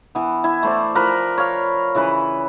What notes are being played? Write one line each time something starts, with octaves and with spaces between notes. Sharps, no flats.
E3 B3
E4
A3 C5 D5
F3 A#4 B4
C#5 F5
C#3 E3 B4